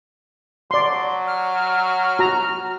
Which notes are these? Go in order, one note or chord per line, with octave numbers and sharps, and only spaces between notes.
F#3 D5 C6
F6
F#4 A#5